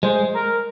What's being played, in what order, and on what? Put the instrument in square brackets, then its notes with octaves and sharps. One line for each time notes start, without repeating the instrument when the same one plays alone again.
[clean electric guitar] G#3 [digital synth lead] C5
[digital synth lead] A#4